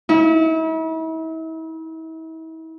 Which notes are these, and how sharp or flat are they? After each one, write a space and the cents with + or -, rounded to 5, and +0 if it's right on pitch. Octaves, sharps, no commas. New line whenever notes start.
E4 -40